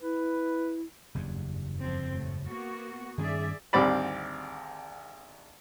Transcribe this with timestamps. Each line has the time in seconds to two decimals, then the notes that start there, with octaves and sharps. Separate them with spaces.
0.01 E4 B4
1.15 F#1 E2 G2
1.79 F3 C4
2.13 A2
2.46 A#3 B3 F#4
3.18 G2 D#3 C#4 G#4 D5 E5
3.73 G#1 D2 G3 C4 D5 B5